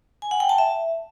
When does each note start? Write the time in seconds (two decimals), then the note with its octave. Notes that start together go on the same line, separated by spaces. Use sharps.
0.22 G#5
0.31 F#5
0.40 G5
0.49 A5
0.58 E5